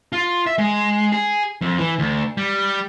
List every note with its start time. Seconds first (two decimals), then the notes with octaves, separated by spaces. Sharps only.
0.13 F4
0.46 E5
0.58 G#3
1.12 G#4
1.61 F2
1.79 E3
1.99 D2
2.37 G3